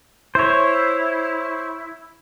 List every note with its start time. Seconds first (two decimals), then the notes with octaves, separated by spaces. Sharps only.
0.35 E4 C5 C#5